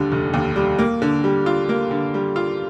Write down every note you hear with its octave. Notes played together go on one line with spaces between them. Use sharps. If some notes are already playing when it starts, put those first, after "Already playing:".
Already playing: F1 D#2 D3 G3
F1
D#2
G3
A#3
D3
G3
F4
A#3
D3
G3
F4